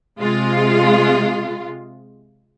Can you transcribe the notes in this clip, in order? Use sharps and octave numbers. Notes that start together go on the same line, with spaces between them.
C3 G#3 F4